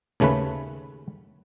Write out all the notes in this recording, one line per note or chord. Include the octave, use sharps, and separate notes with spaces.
D#2 C#3 A3 C#4 B4